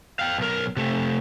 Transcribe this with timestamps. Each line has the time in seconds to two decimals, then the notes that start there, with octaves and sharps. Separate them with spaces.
0.19 F5 G5
0.38 B1 A#4
0.77 C3 A3